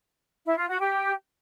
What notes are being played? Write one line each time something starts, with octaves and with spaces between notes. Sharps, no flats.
E4
F4
F#4
G4